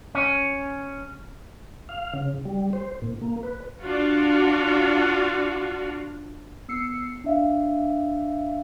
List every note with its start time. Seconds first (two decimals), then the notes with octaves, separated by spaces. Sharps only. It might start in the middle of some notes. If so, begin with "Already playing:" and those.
0.15 C#4
1.89 F5
2.14 C#3
2.45 G3
2.73 C5
3.02 A#2
3.22 A#3
3.43 B4
3.82 D4 F4 F#4
6.68 B3 E6 C7 C#7
7.24 D4 E5 F5